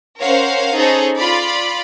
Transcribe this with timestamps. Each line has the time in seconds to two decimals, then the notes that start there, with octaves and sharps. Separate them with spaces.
0.22 C#4 A#4 C5 C#5 F5 F#5
0.74 C#4 D#4 G#4 A4 C5 C#5
1.17 F4 D5 B5